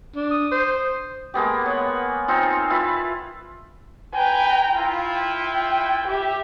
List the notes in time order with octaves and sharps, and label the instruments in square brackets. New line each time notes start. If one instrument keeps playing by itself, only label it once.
[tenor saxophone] D4
[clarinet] D#6
[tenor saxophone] C5
[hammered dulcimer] G#3 A#3 B3 G4
C#5 F#5
C4 D#4 F4
E4 F4 B4
[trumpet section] B4 G#5 [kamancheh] G5 A#5
[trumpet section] E4 F4
[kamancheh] G5
G4 E5